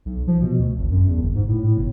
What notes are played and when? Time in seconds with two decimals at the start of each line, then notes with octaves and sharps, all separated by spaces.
0.05 B1
0.27 F3
0.42 B2
0.58 D2
0.77 G#1
0.91 F#2
1.08 E2
1.21 G1
1.35 G#2
1.48 A2
1.63 A2
1.77 G1